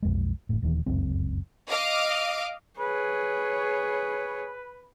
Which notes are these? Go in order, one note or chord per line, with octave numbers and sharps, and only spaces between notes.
B1 F2 G#3
F#1 A2
D#1 D#2 D#3 E3
F1 C#2 F#2 C4
D#5 F5 D6
G#4 B4 C#5